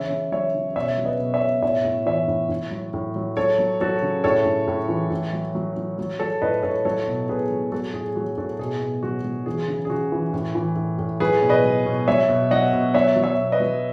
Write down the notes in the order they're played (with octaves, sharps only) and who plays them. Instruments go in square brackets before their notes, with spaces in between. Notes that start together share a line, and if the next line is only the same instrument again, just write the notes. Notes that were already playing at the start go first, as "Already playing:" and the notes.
Already playing: [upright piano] C#3 E3 C#5 E5
C#3
F#3 C#5 E5
C#3
B2 C#5 E5
F#3
B4 D#5
B2
C#5 E5
B2
A2 C#5 E5
A2
E3 C#5 E5
A2
A2
F#3
A2
F#3
F#3 A4 C#5
F#3
F#3 F#4 A4
C#3
A2 A4 C#5
A2
A2
E3
A2
F#3
F#3
F#3
F#3
F#3 A4 C#5
A2 B4 D#5
A2 A4 C#5
F#3 A4 C#5
B2
B2 G#4 B4
F#3
F#3 F#4 A4
A2 G#4
F#3 F#4
A2 F#4 A4
B2 G#4
B2
F#3 F#4
F#3
E3 G#4
C#3
G#4
C#3 F#4
E3
A2
E3
A2
A2
F#3 G#4 B4
B2
B4 D#5
F#3
B2
F#3 C#5 E5
B2
F#3 D#5 F#5
B2
F#3 C#5 E5
F#3
C#5 E5
B2
B4 D#5
F#3